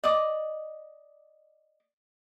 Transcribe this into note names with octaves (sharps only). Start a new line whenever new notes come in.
D5 D#5 D6